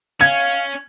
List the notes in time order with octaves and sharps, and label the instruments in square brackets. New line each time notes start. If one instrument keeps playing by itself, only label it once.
[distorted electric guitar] C#4 [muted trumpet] F5 [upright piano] G#6